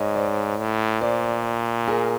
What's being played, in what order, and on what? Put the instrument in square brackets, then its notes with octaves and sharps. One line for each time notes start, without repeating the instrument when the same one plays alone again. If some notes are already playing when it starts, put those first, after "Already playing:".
Already playing: [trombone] G#2 [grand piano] C#5 D#5
[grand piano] C5 D5
[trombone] A2
[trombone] A#2 [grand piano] C5 D5
[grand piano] G#4 A#4